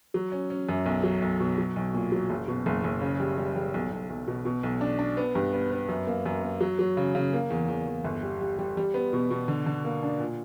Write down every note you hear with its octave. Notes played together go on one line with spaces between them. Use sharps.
F#3
C#4
C#4
F#2
B1
F#3
B1
B2
F#3
B1
A#2
F#3
F#1
B2
F#1
F#1
C#3
G3
G3
G3
B1
B1
B1
B2
B2
B1
D4
D4
B3
G2
B3
B3
F#2
A#3
F#2
A#3
F#3
F#3
C#3
C#3
A#3
E2
E2
E2
G1
G3
G3
G3
G3
B3
B2
B2
D3
D3
A#3
D4
A#2